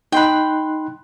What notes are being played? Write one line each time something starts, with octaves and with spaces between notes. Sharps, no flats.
D#4 G5 B5 C6 F#6